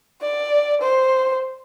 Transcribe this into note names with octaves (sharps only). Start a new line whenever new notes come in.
D5
C5